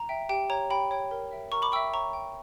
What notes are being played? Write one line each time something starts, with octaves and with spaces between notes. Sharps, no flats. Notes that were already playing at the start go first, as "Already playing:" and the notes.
Already playing: A#5
E5 G5
G4 G5
C#5 G5 A#5
G4 G5 B5
C#5 G5
A#4
E5 G5
A#4 A#5 C#6
B5 D6
E5 G5 C#6 E6
C#5 A#5 C#6
G5